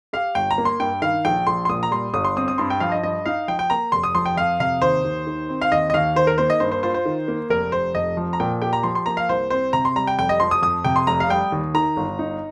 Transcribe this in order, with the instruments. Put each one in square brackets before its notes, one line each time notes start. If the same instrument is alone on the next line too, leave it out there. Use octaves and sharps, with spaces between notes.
[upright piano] G4 [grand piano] F5
[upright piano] G1 [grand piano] G5
[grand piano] A#5
[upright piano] A#3
[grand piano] C6
[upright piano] G2 [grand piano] G5
[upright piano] D#3 [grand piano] F5
[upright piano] A#1 [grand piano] G5
[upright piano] A#1 [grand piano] C6
[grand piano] C6
[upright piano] A#2 [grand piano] D#6
[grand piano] A#5
[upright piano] G3 [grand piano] C6
[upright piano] G1 [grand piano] D#6
[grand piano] C6
[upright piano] C4 [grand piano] D#6
[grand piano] D#6
[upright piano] G2 [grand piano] C6
[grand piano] G5
[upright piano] F3 [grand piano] F5
[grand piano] D#5
[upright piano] G2 [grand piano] D#5
[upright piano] D#4 [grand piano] F5
[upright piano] F3 [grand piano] G5
[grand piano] G5
[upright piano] A#3 [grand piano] A#5
[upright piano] F1 [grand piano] C6
[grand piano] D#6
[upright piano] F3 [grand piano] C6
[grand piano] G5
[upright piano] F2 [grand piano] F5
[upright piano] C3 [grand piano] F5
[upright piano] D#2 [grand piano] C5
[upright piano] D#2
D#3
C4
[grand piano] F5
[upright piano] D#2 [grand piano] D#5
[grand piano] D#5
[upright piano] D#2 [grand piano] F5
[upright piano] D#3 [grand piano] C5
[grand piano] A#4
[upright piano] A#3 [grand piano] C5
[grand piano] D#5
[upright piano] G2 [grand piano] C5
[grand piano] C5
[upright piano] F4 [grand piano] C5
[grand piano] C5
[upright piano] D#3
A#3
[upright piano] F1 [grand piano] A#4
[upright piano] F1 [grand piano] C5
[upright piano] F2 [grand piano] D#5
[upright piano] F3
[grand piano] A#5
[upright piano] A#2 [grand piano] G5
[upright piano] G4 [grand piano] G5
[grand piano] A#5
[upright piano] F3 [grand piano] C6
[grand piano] C6
[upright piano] A#3 [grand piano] A#5
[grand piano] F5
[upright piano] C2 [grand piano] C5
[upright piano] C4 [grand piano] C5
[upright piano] C3 [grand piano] A#5
[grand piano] C6
[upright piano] G3 [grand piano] A#5
[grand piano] G5
[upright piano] F1 [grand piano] G5
[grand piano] D#5
[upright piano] F3 [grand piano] C6
[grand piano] D#6
[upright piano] F2 [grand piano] D#6
[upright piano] C3 [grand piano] G5
[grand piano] C6
[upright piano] F1 [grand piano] A#5
[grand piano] F5
[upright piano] G3 [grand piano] G5
[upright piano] D#2
[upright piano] D#3 [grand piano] A#5
[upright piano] G1
D#4